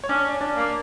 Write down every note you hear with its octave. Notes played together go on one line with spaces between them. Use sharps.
C#5
C#4 D4 D5
D4 D5
A#3